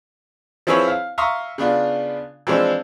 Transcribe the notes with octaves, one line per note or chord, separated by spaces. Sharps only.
F3 C4 E4 G#4 B4 C#5
F5
E5 F5 A#5 C6 C#6 D#6
C#3 B3 D4 F4
E3 F3 G#3 C4 D4